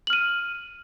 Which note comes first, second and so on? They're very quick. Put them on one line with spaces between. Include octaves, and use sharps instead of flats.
F#7 F6 D#7